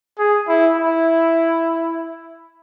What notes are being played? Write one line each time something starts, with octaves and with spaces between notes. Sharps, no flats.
G#4
E4
E4